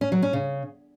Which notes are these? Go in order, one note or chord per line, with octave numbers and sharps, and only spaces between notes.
C#4
F#3
C#4
C#3